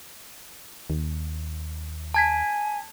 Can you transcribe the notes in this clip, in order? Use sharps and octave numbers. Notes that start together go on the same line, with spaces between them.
D#2
G#5 A5 G#6 B6